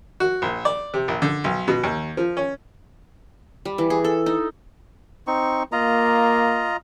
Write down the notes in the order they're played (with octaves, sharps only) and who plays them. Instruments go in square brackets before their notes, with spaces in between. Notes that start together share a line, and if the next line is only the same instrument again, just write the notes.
[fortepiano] F#4
A#1
D5
C3
A#1
D3
B1
B2
D#2
F3
C#4
[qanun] G3
E3
G#4
A4
D#4
[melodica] C4 D#4 C#6
[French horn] A#3 [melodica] F4 D#5 A#5